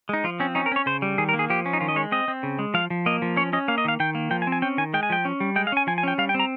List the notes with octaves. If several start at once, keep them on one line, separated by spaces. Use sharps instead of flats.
G#3 D#4
F3 F4
C4 C#4
C#4 D#4
A#4
C#4 C#5
C#3 C5
G3
D#3 G#4
A#4
A#3
G#4
F3 G4
C#4
D#4
D#3 F4
D#5
G#3 C#5
C4 D#5
C4
C#3
G#3
F3 F5
F3
A#3 D#5
F3
C#4 C#5
C#4 D#5
A#3 F5
D#5
D#3 F5
D#3 G5
A#3
F3 G5
G#5
C4
G#5
C#4 G5
D#3 G#5
G#3 G5
G#5
F3 G5
C#4
G3
G#3 G5
F5
C#4 G#5
F3 G#5
G#5
C#4 G5
G3 F5
G5
C4 A#5